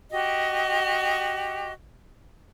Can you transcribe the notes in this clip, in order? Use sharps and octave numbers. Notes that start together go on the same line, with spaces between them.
F#4 G4 D#5